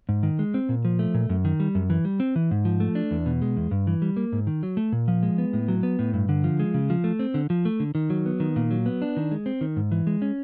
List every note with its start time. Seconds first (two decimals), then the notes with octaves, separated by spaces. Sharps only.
0.09 G#2
0.23 D#3
0.39 G#3
0.54 C4
0.69 A#2
0.85 F3
0.99 A3
1.14 A#2
1.29 F#2
1.45 D#3
1.60 G3
1.75 F#2
1.90 E3
2.05 G3
2.20 C4
2.36 E3
2.51 G#2
2.65 F3
2.80 A3
2.95 D4
3.11 E2
3.26 B2
3.42 G#3
3.57 E2
3.71 G2
3.87 E3
4.02 G3
4.17 A#3
4.32 G#2
4.47 D#3
4.63 F#3
4.77 A3
4.92 A#2
5.08 F3
5.23 G#3
5.38 B3
5.53 A2
5.68 F#3
5.83 B3
5.99 A2
6.14 G2
6.29 D3
6.44 F3
6.59 G#3
6.74 C#3
6.90 F3
7.04 A3
7.19 C4
7.34 D3
7.50 F3
7.65 A3
7.80 D3
7.95 D#3
8.10 F#3
8.26 B3
8.40 D#3
8.56 A#2
8.71 F#3
8.86 B3
9.02 D4
9.17 D#3
9.31 G#3
9.46 C4
9.61 D#3
9.76 G#2
9.92 E3
10.07 G#3
10.22 C#4